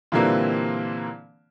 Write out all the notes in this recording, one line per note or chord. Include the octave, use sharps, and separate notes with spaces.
A#2 D3 E3 G3 A#3 C4